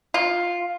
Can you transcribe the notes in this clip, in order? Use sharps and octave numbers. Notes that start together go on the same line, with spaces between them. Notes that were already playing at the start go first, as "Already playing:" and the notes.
F4